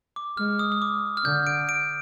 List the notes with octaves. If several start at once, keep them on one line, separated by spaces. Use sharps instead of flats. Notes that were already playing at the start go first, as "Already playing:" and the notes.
D6
G#3 F6
D#6
D#6
D6
F6
D3 G6
D7
D7